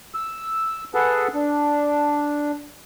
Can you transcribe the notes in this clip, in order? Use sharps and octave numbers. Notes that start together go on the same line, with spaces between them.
E6
G#4 A4 B4 F#5 A5
D4